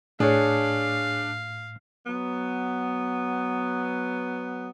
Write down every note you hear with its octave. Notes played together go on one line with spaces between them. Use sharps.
A2 D4 G#4 C#5 F5
F#3 B3